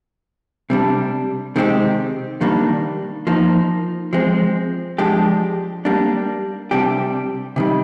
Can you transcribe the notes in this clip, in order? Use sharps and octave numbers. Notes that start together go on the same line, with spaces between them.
C3 G3 D4
C3 D#3 G#3 C4 G4
D#3 G3 A#3 D4
F3 A#3 D#4
F3 G#3 C4
F3 G#3 D4 G4
G3 A#3 D4
C3 G3 D4 G4
C3 D#3 G3